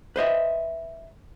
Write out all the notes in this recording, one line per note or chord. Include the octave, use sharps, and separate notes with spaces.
B4 C5 D#5 E5